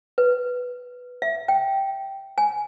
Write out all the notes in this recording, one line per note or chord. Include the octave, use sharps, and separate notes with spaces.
B4
E5
G5
G#5